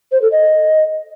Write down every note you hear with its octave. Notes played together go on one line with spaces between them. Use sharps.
C5
A4
D#5